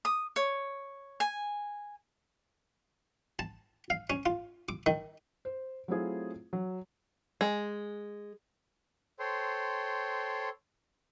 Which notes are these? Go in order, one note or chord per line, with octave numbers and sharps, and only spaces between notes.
D#6
C#5
G#5
A5
F5
C#4
F4
D6
D#3
C5
F#3 A3 C4 E4 F4 G#4
F#3
G#3
A4 C5 C#5 G5 C6